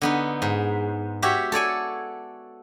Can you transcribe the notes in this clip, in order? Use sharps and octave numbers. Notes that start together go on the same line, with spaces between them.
D3 B3 D#4
G#2
F#4 G4 C#5 E5
A4 C#5 D5 G#5